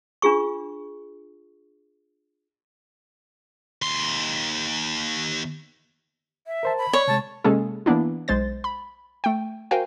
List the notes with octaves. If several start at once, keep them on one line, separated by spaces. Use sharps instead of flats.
D4 F4 G#4 C#6
D#2 C6
E5
A#4 C5 A5
B5
C#5 D5
C3 G#3 A5
C3 G#3 A#3 C#4 G#4 A4
E3 A#3 B3 D4 E4
B1 G#3 C5 A6
B5
A3 G5
F#4 A#4 C5 F5 G5 G#5